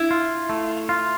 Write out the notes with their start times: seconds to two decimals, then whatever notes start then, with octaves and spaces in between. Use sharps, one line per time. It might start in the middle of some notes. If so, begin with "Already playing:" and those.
Already playing: E4
0.11 F4
0.49 A3
0.89 F4